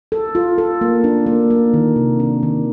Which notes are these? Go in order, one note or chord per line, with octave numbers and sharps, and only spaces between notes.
A4
F4
A4
A#3
D4
A#3
A#3
D#3
C3
D4
D#3